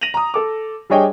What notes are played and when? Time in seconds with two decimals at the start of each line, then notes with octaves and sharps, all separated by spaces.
0.01 A#6 D#7 F7 F#7
0.14 A#5 D#6
0.34 A4 D6
0.90 G3 D4 G#4 C#5 D#5 G5